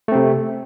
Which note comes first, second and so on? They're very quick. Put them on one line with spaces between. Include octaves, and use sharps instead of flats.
A3 C4 C3